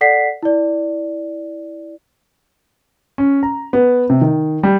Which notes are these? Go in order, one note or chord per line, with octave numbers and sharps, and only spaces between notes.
A4 D5 F#5 B6 C7
E4 D5
C#4
A#5
B3
C3
D#3
G3